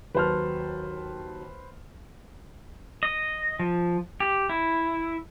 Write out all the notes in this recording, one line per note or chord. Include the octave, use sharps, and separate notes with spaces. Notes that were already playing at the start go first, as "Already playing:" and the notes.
D#2 F#3 B4 C5 A5 F6
D#5
F3
G4
E4